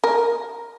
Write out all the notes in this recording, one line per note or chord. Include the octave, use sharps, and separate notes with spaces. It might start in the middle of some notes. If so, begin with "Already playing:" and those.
A#4